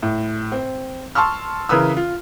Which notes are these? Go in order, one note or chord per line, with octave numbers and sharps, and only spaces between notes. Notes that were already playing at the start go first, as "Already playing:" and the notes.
A2
C4
A5 C6 C#6 E6 F6
C#3 E3 A#4 B4 D#6 E6
F4